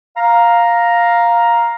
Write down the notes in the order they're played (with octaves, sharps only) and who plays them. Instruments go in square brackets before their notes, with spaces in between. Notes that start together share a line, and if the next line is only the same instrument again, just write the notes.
[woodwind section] F5 A#5